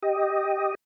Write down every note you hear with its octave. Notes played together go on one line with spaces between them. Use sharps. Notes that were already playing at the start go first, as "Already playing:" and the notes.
G4 D#5